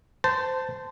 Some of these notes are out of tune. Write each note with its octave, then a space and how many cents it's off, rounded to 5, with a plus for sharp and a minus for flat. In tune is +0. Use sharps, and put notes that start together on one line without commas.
C5 -20 A5 +10